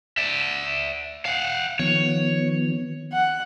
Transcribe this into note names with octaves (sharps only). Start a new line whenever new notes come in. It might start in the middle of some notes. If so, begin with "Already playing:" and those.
D5 E5
F5 F#5
D#3 F3 B3 C#5
F#5